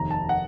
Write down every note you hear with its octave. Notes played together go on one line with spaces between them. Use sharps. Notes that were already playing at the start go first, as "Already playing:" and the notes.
Already playing: F1 D#2 D#3 A#5
A5
F#5